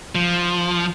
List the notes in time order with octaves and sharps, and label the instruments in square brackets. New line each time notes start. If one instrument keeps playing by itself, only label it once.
[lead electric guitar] F3